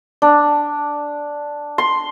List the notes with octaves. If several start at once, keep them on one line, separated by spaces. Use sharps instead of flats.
D4
C6